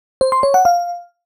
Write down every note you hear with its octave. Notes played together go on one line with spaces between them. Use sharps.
C5
C6
C#5
F#5
F5